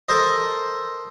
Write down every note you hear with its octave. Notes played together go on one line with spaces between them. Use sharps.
A4 A#4 C5 D#5